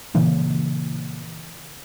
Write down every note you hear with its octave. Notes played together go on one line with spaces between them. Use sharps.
A#2 C#3 E3 A#3